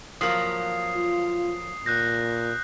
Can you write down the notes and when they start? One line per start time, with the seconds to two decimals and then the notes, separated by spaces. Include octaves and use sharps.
0.21 F3 F#3 A#3 D#6 C7
0.96 F4
1.86 A#2 F#6 G6 A#6